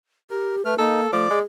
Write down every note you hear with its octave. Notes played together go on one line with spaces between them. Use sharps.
G4 A#4
A3 B4 F6
A#3 D#4 A4
F3 A3 D5 D6
G#3 G#4